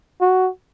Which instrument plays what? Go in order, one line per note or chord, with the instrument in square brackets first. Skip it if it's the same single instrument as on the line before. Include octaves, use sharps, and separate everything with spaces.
[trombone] F#4